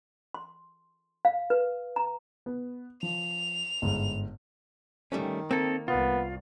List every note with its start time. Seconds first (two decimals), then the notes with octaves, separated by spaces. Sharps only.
0.34 C6
1.25 F5
1.50 B4
1.96 A#5
2.46 B3
3.03 F3 F7
3.82 G1 G#2
5.12 D#3 G3 A3 C#4
5.51 A#3 C4 A4
5.88 C2 B3 F4